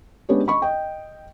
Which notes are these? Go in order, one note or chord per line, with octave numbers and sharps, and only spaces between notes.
G#3 B3 C#4 D4 G4 C#5
D#5 B5 C#6
D#5 G5